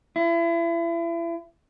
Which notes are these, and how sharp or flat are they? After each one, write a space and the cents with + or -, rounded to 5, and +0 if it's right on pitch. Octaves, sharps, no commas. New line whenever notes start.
E4 +35